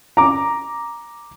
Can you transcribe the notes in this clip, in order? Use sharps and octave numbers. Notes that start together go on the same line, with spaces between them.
A#5 D6